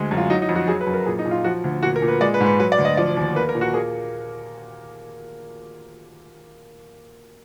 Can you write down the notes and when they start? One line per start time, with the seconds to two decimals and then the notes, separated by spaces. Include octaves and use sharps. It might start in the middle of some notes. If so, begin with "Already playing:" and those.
Already playing: D2 G#3
0.11 F#2
0.17 F4
0.30 F#3 D#4
0.42 D#4
0.49 F2
0.55 F#4
0.68 F#3 G#4
0.81 B4
0.87 F#2
0.94 A#4
1.06 A#2 G#4
1.19 D#4
1.25 A#2
1.31 F4
1.44 F3 F#4
1.64 D2
1.83 A#2 F#4
1.96 A#4
2.02 A#2
2.08 B4
2.21 G#3 D5
2.34 B4
2.40 G#2
2.46 B4
2.59 F#3 B4
2.72 D5
2.78 D2
2.85 D#5
2.97 F3 D5
3.17 D#2
3.35 A#3 B4
3.49 A#4
3.55 A#2
3.61 F#4
3.74 A#3 G#4